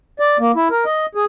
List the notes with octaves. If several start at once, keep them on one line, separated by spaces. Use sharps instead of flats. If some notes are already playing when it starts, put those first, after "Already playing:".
D5
A#3
E4
A#4
D#5
G#4